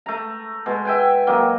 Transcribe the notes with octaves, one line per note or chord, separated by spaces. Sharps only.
A3 A#5
B2 G#3
E5 G5 G#5
D#3 F#3 A#3